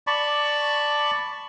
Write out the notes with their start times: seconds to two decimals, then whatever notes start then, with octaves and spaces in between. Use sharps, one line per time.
0.07 D5 A5 B5 C#6